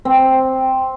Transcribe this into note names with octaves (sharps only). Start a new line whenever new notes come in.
C4